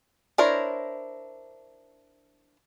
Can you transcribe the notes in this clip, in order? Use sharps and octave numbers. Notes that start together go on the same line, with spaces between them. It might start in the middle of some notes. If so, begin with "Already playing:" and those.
D4 E4 A#4 C5 C#5